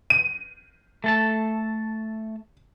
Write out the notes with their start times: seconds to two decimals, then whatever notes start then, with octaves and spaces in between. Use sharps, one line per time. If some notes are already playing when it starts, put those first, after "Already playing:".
0.10 D#7
1.04 A3 A4 A5